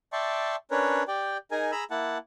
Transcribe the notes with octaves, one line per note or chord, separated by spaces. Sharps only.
D5 E5 G5 A5 C6 C#6
C#4 D4 A#4 B4 C#5
G4 D5 G5
D#4 G#4 A#4 G#5
G#4 A#5 B5 E6
A#3 E4 F#5 A5